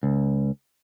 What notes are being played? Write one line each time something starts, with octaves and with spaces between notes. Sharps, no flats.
C#2